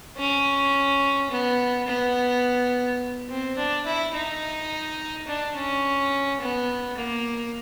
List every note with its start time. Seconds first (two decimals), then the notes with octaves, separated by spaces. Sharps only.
0.18 C#4
1.31 B3
1.87 B3
3.29 C4
3.57 D4
3.86 E4
4.14 D#4
5.27 D4
5.55 C#4
6.40 B3
6.97 A#3